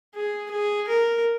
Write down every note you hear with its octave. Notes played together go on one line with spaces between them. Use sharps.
G#4
G#4
A#4